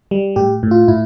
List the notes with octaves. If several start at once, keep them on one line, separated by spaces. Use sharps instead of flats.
G3
A2 G4
A2
F4
A2 E4